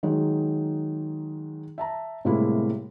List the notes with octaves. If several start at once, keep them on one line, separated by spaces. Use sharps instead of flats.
D#3 F#3 G#3 D#4
E5 A5 A#5
A2 C3 G3 G#3 A#3 E4